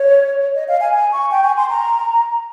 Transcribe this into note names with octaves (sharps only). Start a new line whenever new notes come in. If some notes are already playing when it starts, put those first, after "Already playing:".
Already playing: C#5
D#5
F5
G#5
G#5
C#6
G5
G#5
C6
A#5